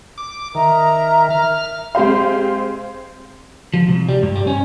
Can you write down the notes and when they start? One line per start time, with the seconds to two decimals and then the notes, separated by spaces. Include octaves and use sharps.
0.18 D6
0.55 D#3 A#4 E5 A#5
1.30 F6
1.95 G#3 C4 G4 C5 F5
3.74 F3
3.88 C2
4.09 G3
4.23 G2
4.36 G3
4.47 C#4